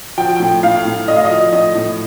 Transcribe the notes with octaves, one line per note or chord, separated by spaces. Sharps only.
F3 G5
A2 G5
A2 F5
A2
A2 D#5
F5
D#5
F3
A2 D#5
A2